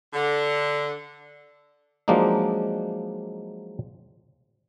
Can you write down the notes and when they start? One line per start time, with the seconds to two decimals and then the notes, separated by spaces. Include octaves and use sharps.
0.13 D3
2.08 F3 F#3 G#3 A#3 D4 D#4